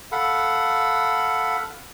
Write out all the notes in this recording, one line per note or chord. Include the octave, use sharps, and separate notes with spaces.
A4 F5 F#5 B5